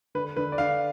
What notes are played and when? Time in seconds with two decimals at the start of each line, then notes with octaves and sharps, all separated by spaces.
0.15 D3 B4
0.37 D3 B4
0.52 D5
0.58 D3 F5